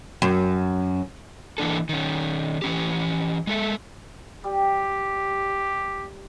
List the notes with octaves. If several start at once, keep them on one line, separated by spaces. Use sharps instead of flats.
F#2
E3 A#3 D4 A4
D#3 C#4
E3 C#4 G4
G#3 A4 E5
G3 G4